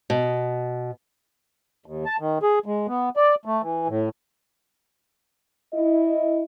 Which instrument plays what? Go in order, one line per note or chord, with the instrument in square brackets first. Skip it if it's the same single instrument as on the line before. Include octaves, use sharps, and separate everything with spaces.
[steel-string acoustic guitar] B2
[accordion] D#2
A5
D#3
G#4
G#3
B3
D5
A3
E3
A2
[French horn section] E4 D#5